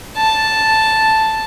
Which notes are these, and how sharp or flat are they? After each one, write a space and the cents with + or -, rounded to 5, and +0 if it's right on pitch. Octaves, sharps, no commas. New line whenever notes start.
A5 +0